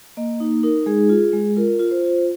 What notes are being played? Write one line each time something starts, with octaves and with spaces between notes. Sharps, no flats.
A#3 D#5
D#4
D#4 A#4
G#3 G#4
F4
G#3
F4 A#4
F4
C5
F4